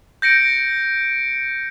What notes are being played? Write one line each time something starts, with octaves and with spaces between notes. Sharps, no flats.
G6 A#6 C#7 D7